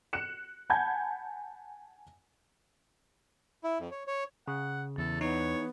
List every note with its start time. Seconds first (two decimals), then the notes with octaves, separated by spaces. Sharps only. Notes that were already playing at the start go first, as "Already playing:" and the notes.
0.13 F#6 C#7 E7
0.70 F#5 G#5 A5 B5 G6 G#6
3.64 E4
3.80 F2
3.92 C#5
4.07 C#5
4.48 C#3 F#5
4.98 E2 A4
5.21 B3 D#4 C#5